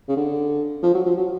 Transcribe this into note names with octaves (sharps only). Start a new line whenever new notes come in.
C#3
D3
F3
F#3
F3
F#3